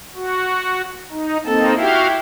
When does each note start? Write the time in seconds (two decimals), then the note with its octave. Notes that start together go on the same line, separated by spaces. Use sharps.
0.15 F#4
1.11 D#4
1.46 A#3 C4 D#4 A4
1.77 E4 F#4 G4 F5